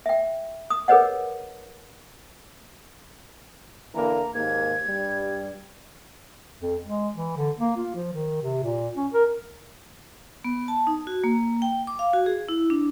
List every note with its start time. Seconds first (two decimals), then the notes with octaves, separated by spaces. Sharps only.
0.06 E5 G5
0.70 D#6
0.88 G#4 A#4 B4 C#5 D#5 F#5
3.95 D3 E3 A#3 A#5
4.34 D#2 G#2 A#3 G#6
4.88 G2 G3
6.60 F2
6.85 G#3
7.16 E3
7.37 D3
7.59 A#3
7.77 F4
7.95 F3
8.13 D#3
8.42 C3
8.63 A#2
8.97 C#4
9.14 A#4
10.44 B3
10.68 A5
10.87 D#4
11.07 F#4
11.24 A#3
11.62 G5
11.87 D6
11.99 F5
12.13 F#4
12.26 G#4
12.49 E4
12.70 D4